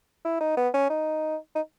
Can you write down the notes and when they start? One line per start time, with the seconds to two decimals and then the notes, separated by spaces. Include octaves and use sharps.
0.25 E4
0.41 D#4
0.57 B3
0.74 C#4
0.90 D#4
1.55 D#4